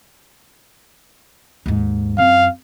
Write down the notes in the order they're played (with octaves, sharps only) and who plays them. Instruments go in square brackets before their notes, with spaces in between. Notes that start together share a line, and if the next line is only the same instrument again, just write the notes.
[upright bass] D#2 G#2
[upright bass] F#2 C4 [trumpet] F5